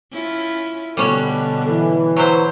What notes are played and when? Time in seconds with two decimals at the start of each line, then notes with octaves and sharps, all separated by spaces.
0.12 C#4 E4 F4
0.97 B2 D3 G3 C#4 A4
1.68 E3
2.16 F#3 E4 C5